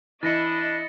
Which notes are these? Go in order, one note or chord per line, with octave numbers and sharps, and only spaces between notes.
E3 D4 E4 D#5 A6 A#6 C#7